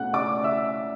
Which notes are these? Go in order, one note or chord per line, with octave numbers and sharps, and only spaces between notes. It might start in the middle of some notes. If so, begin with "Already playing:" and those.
Already playing: C#2 B2 A3 C#4 F#5 F#6
D5 D6
E5 E6